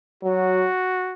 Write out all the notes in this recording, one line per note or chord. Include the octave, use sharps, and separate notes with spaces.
F#3 F#4